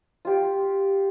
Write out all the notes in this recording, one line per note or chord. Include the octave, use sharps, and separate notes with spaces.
F4 G4